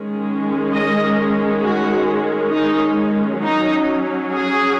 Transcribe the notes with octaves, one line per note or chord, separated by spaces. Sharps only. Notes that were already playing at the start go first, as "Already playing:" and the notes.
Already playing: D#3 G#3 C#4
D#5
F#4
D#4
F#3 C#4 D#4
G#4